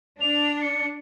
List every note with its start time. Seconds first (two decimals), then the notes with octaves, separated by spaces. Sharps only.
0.21 D4 F7
0.62 C#7